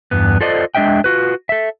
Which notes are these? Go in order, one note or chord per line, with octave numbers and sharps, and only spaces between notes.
E2 G2 B3
F4 A4 C5 D5 D#5
G#3 D4 D#5 E5 G5
F4 F#4 B4
A4 E5